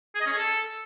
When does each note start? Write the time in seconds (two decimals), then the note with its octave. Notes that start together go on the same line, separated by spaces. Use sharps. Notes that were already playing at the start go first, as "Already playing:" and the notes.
0.15 G#4
0.21 D#5
0.26 C#4
0.32 G#4
0.37 A4